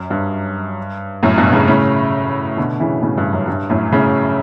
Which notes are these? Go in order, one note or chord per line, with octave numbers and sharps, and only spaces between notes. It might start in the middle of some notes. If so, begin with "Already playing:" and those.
Already playing: F#2
G2
F#2 A2
G2 B2
A2 C#3
A2 C#3
B2 D3
C#3 E3
A2 C#3
G2
F#2
G2
F#2 A2
A2 C#3